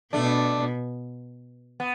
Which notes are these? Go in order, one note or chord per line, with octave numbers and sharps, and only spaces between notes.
B2 A3 D4
B3